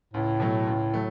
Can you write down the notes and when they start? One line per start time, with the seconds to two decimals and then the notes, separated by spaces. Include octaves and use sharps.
0.13 C#2 A2
0.40 B2 F#3 A3
0.67 C#2
0.94 F#3 A3